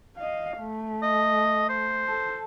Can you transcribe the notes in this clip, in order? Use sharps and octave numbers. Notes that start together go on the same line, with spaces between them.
D#5 F5
A3
D#5
C5
A4 A5